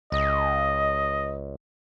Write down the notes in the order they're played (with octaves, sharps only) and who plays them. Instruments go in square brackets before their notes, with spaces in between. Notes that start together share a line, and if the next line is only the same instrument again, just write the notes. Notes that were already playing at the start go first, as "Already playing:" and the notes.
[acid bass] C#2 [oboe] D#5